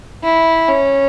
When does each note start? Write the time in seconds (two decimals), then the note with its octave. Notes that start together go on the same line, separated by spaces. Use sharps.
0.23 E4
0.68 C#4